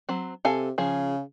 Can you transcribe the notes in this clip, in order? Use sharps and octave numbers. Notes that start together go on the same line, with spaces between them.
F#3 C4
C3 A4 F5 G#5
C#3 F3 G#4